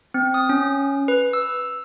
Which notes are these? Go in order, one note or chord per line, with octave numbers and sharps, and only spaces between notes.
C4
D#6
C#4
B4
E6